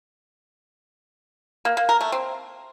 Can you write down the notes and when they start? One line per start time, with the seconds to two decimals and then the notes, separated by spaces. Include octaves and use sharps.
1.65 A#3
1.77 A#3
1.89 A#4
2.01 A3
2.12 C4